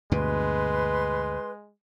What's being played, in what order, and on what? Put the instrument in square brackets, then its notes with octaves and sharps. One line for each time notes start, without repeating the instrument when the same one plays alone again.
[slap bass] D2 G2 B2 [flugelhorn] G#3 [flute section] B4 C6